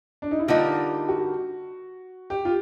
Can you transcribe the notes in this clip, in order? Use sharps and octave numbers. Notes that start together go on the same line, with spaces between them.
D4
D#4
E4
D3 G3 A#3 D#4 F4
F#4
G4
F4